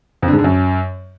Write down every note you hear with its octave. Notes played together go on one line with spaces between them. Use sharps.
F2
D3
G#2
D3
F#2